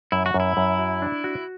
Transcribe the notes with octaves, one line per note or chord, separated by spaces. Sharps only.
F#2 E4
F#4
F#2
E4
F#2
F#4
D4
F#4